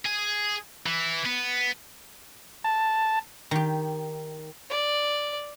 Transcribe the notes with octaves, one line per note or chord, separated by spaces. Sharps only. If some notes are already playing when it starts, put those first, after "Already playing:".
G#4
E3
B3
A5
D#3 G4
D5